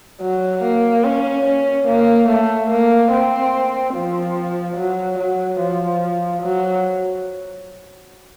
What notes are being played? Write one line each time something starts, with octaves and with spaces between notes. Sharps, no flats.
F#3
A#3
C#4
C#4
A#3
A3
A#3
C4
F3
F#3
F#3
F3
F#3